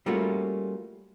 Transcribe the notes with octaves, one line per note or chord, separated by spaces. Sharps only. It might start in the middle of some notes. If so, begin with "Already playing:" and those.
G3 A3 A#3 C#4 F4 F#4